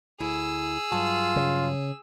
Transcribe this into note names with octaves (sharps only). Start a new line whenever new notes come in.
D2 E4 G#4 E6
G2 F#3 F4 A5
C#3